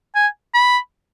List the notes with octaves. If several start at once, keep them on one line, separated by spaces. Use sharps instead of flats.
G#5
B5